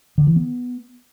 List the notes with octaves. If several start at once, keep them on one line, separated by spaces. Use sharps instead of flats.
D3
E3
B3